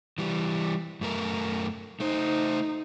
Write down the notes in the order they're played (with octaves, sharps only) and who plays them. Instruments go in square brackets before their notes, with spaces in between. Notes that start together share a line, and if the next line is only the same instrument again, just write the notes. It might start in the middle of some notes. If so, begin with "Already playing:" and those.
[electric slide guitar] E3 G3
F#2 A3 A#4
[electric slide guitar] A3 C5 [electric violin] D#4